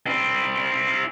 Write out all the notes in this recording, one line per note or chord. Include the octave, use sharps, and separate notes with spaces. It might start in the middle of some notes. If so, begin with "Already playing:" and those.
C4 E4